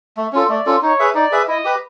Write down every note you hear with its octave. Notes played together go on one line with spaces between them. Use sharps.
A3
C#4 F4 A4
A3 D5
C#4 F4 A4
D#4 C#5
G#4 B4 E5
D#4 D5
G#4 B4 E5
E4 D#5
G4 B4